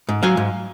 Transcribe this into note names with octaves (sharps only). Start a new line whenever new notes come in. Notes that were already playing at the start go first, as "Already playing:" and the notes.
G#2
F#3 F5 G#5
G#2